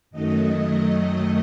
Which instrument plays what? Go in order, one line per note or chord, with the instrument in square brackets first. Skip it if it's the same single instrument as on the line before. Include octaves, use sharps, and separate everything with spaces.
[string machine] F#2 D#3 F#3 A3 D#5